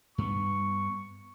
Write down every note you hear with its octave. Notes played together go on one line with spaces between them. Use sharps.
G2 B3 C#6